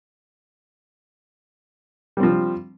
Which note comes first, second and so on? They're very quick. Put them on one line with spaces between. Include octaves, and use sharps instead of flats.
G3 C4 F3